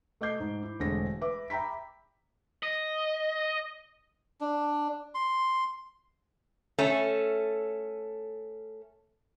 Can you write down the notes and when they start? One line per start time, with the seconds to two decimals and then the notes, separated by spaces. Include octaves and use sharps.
0.21 A3 D#5 D6 G6 C7
0.40 G#2
0.63 E4
0.79 E1 D3 G#3 A3 C4 A#6
1.21 B4 E5 D6
1.50 E5 G5 A#5 B5 B6
2.63 D#5
4.41 D4
5.15 C6
6.79 A3 C#4 A4